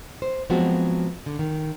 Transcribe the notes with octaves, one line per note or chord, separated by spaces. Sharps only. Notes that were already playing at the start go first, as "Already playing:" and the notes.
C5
F3 F#3 G#3 B3 C4 F#4
D3
D#3